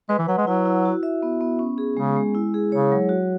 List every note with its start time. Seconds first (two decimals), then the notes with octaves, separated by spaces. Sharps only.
0.09 G#3 B4
0.19 E3
0.28 F#3 F#5
0.38 G#3
0.47 F#3 E4
0.65 E4
0.85 F#4
1.03 E5
1.23 B3
1.41 B3
1.59 C#4
1.78 G#4
1.97 C#3 G#3
2.16 G#3
2.35 E4
2.54 G#4
2.72 C#3 C#5
2.92 F#3
3.09 F#4